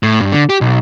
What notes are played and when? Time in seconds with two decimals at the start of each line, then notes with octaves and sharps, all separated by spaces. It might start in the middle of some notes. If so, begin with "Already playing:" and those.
0.03 A2
0.21 G2
0.32 D3
0.49 G4
0.61 B1